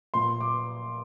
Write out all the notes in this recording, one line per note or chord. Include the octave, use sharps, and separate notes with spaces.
A#2 C6
D6